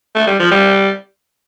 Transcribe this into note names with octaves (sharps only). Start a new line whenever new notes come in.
A3
G3
F3
G3